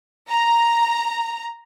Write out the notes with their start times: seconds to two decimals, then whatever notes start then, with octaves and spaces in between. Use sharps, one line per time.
0.29 A#5